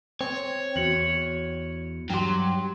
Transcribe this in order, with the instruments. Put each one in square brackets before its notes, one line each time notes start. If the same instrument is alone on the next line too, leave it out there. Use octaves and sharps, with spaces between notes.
[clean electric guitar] C4 [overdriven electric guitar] C#5
[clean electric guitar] E2 [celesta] F#4 C#7 F#7
[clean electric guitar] G2 G4 [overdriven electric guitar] F#3 [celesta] G5 C6